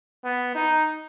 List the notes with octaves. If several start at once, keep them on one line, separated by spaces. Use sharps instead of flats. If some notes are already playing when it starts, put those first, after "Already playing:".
B3
D#4